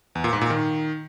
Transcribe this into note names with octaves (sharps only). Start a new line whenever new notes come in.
E2
A#2
G#2
A#2
D#3